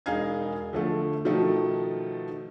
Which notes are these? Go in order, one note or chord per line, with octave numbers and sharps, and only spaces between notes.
E1 D#4 G#4 F5 G#6
D3 F3 A3
B2 D#3 F3 A3